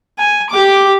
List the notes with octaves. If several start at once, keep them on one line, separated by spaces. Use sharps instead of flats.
G#5
G4 D6